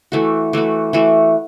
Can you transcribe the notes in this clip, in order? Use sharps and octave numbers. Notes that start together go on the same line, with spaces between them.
E3 A3 F#4
E3 A3 F#4
E3 A3 F#4